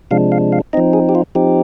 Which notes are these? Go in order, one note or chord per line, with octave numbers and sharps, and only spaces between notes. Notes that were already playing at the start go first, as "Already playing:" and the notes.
C3 F3 G#3 D4 F5
F5
F5
F3 C4 D#4 D#5
G#4
G4
F4
F3 C4 D#4 G4